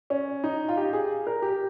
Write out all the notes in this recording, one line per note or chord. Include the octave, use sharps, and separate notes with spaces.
C#4
D#4
F4
G4
G#4
A#4
G4